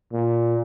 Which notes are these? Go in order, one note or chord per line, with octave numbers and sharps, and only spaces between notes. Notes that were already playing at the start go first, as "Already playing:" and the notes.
A#2